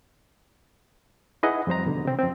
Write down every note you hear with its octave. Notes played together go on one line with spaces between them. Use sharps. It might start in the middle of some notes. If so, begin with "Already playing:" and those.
D#4 E4 G#4 B4 D#5 F#5
F2 G3 C5 A#5
E2 B2 D3
C3 C4
F2 C4